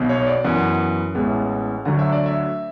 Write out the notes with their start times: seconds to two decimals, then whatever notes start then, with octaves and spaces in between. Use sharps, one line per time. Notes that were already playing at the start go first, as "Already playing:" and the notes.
Already playing: B1 B2 F#3 B3
0.09 C#5
0.27 D5
0.44 F#2 E3 B3 F#5
1.15 A1 A2 G#3 B3
1.85 D2 D3 F#3 A3 F#5
1.99 E5
2.12 D5
2.26 E5